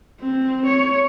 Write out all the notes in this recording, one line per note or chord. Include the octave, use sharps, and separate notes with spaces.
C4
C#5